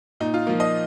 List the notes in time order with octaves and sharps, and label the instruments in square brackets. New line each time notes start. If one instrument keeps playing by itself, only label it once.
[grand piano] A#2 D#4
F4
F3 A#3 F4
D#5